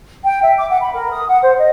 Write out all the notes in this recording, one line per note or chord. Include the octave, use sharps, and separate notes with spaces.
G5
E5
D6
F#5
B5
A#4
D#6
F#5
C5
D#5